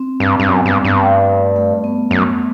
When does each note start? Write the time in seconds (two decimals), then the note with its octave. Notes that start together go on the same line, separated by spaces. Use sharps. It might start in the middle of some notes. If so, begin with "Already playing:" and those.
Already playing: C4
0.20 G2
0.40 G2
0.48 F#2 B3
0.65 G2
0.74 G3
0.85 G2 G3
1.02 A3
1.56 A3
1.84 B3
2.11 F#2